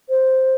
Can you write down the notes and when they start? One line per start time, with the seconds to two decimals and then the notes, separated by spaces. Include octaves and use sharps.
0.09 C5